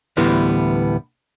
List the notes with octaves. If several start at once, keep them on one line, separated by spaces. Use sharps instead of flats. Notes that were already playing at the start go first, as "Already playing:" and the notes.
D2 A2 E3 G3 B3